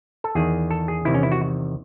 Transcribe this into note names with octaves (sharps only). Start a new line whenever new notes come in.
A4
E2 D#3 G#4
A4
G#4
E2 C3 D#3 E4
C#4
E4
F#4